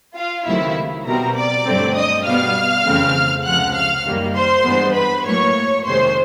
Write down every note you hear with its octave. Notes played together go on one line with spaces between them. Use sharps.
F4 F5
C#2 C3 D#3 F#3 A3 E4 E5
B2 G3 C4 A#4 A#5
D5 D6
G2 D3 F#3 A3 C4
D#5 D#6
B2 G3 B3 F5 F6
F2 C#3 E3 A3 C4
C#2 C3 F3 F#5 F#6
F5 F6
F#2 D#3 G3 A#3
C5 C6
G2 E3 G#3 B3
B4 B5
A2 F#3 A#3 C#5 C#6
F2 C3 D#3 G#3 C5 C6